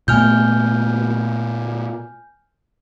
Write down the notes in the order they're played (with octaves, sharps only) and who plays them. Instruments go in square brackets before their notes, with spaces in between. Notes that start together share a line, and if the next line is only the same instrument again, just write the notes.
[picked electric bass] A#2 A3 B3 [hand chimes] G#5 F6 G6